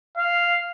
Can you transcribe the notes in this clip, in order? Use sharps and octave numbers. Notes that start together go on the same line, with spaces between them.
F5